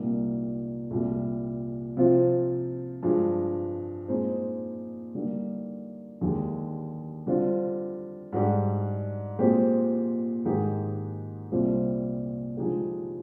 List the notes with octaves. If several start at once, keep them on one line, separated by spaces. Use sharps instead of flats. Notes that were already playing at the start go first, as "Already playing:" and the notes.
Already playing: C2 A#2 G3 A#3 D#4
C2 A#2 G3
C3 F3 C4 F4
G2 F3 G#3
A#2 G#3 C4 D#4
D3 G3 A#3 D#4
D#2 D3 G#3 D#4 G4
D3 G3 C4 F4
G#2 G3 D4 G4
A#2 G#3 C4 G4
G#2 D#3 G#3 D#4 G4
C2 A#2 G3 C4 F4
D3 F3 G#3 D#4 G4